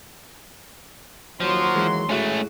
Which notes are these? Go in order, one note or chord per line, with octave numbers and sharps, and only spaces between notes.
D#2 F3 F#3 C6
E3 G#3 A#3
A2 G#3 A3 C#4 F#4